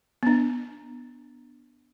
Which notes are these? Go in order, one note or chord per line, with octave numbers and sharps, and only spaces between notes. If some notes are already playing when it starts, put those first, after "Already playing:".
B3 D4